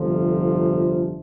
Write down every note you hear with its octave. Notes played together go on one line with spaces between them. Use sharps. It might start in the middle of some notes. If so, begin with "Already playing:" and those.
Already playing: G1 F2 C3 F3